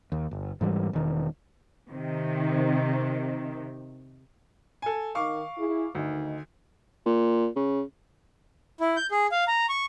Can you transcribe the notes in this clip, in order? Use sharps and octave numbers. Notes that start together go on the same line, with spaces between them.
D#2
G1
G#2 E3 G3
E1 D#3
C3 D#3
A4 G#5
D#3 F5 C#6 D6
E4 G#4
D2 D#3 D#4
A#2
C#3
E4
G6
G#4
F5
A#5
C#6